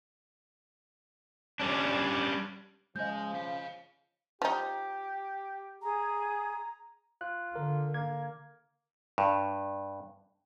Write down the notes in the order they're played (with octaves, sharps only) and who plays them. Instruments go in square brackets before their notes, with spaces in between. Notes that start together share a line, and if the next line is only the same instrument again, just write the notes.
[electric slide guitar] G3 C#4 D4
[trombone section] C#3 F3 [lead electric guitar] G#3 G#5 [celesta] D#5 G6
[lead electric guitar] C#5 F5
[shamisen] F3 D#4 [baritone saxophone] G4
[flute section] G#4 [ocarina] A#5
[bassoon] F4 [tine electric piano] F#6
[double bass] D3 [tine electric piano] A#4
[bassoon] A#3 [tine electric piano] G#6
[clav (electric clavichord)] G2